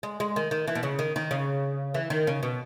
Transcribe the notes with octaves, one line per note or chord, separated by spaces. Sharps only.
G#3
G#3
D#3
D#3
E3
B2
C#3
D#3
D#3
C#3
E3
D#3
C#3
B2